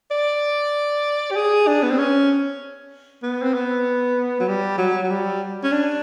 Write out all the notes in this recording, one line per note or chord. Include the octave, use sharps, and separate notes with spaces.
D5
G4
G#4
D4
B3
C4
C#4
B3
C4
B3
F#3
G3
F#3
F#3
G3
C#4
D4